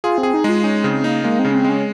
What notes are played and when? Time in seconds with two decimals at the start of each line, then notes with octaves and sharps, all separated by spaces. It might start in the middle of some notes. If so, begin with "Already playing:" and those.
0.04 F4 G#4
0.18 C4
0.23 G#4
0.34 D#4
0.44 G#3 F4
0.64 C#4 D#4
0.84 C#3 C4
1.04 A#3 D#4
1.24 G#3 A#3
1.39 C4
1.45 C#3 C#4
1.54 C4
1.64 G#3 C#4